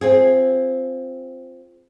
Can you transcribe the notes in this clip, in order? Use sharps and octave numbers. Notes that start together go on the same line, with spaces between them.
C4 F4 G#4